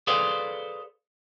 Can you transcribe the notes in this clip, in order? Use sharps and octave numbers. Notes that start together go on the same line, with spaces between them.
G#4 A4 B4 C5 D5 F5